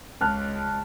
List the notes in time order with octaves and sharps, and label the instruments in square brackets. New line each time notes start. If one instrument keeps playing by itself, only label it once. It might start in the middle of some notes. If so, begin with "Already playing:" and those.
[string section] C#2 [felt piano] A5 F6 F#6